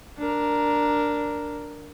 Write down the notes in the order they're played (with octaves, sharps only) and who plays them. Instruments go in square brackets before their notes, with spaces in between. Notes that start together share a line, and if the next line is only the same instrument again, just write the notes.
[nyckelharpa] D4 A#4